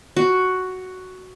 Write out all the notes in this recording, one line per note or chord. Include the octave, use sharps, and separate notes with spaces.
F#4